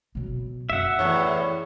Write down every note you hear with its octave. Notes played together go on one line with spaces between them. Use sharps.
B2 F#3
F#2 E5 F#5
E2 A2 C#5